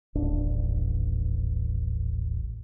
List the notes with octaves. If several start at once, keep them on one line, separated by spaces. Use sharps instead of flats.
D#1 A1 D4